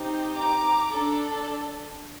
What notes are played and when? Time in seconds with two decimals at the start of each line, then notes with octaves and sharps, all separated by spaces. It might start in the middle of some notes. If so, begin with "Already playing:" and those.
Already playing: C4 D#4 G4
0.37 A#5 D6
0.91 D4 A4